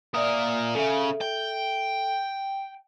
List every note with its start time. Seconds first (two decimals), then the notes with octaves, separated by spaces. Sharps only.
0.14 A#2 A#4 D5 E5 D#6
0.75 C#3 A4 E5
1.21 G5